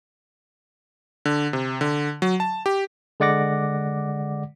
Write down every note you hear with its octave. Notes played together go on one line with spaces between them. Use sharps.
D3
C3
D3
F#3
A5
G4
D3 G#3 D5 F#5 D6 A#6